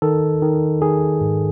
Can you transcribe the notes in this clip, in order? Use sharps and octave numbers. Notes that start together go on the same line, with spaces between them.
D#3 A4
D#3
D#3 G#4
G#2